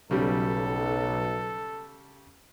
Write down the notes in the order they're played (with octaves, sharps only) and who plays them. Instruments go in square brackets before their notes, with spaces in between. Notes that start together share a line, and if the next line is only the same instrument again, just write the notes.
[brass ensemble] B1 [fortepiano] C#3 G3 [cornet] A4